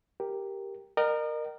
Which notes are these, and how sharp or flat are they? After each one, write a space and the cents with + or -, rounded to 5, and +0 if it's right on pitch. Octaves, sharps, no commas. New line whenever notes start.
G4 +0 A#4 +0
A#4 +0 D#5 -40 G5 -40